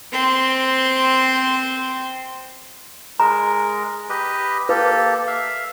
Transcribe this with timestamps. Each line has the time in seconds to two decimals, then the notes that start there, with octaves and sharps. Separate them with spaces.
0.12 C4 C6
3.20 G#3 A#4 A#5
4.09 G4 B4 D#5
4.69 A#3 G4 A4 B4
5.27 E5 F5